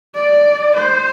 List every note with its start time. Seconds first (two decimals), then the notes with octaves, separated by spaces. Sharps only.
0.15 D5
0.78 C5